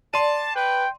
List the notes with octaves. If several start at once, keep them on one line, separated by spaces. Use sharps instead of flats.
D5 A5 C6 D#7
B4 G5